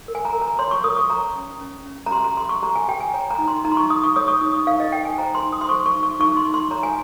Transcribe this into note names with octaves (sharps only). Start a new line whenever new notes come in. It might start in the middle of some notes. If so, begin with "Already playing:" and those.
A#4
G#5
A#5
A#4
A#5
C#5 C6
C#6
A#4 D#6
C#6
C#5 A#5
C#4
C#4
C#4
A#5
G4 C6
A#5
G4 C6
C#6
G4 A#5
G#5
G4 G5
G#5
C#5 A#5
A#5
D#4
C6
D#4 A#5
C6
C#6
D#4 D#6
C#6
C#5 D#6
C#6
D#4 D#6
C#6
D#4 F5
D#5
D#4 G5
G#5
C5 A#5
C6
D#4
D#6
C6
C5 C#6
C#6
D#4
C#6
D#4 C#6
C6
D#4
C6
C#5 A#5
G#5